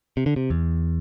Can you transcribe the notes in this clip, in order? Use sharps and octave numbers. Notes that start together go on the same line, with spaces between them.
C3
D3
C3
E2